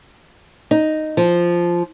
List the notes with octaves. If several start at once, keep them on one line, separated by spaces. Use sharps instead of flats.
D#4
F3